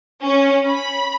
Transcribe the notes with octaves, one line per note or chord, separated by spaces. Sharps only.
C#4
B5